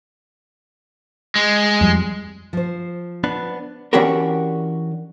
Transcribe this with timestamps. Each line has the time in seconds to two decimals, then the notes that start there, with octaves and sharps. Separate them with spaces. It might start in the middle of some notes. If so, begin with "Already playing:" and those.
1.36 G#3
1.81 F2 G3
2.53 F3 C5
3.24 B3 D4 B4
3.93 E3 C#4 D4 F#4 G4 A#4